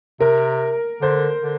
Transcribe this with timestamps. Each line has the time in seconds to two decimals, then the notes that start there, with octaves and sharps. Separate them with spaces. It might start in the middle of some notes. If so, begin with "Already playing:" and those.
0.20 C3 A#4
1.02 D3 C5
1.42 D3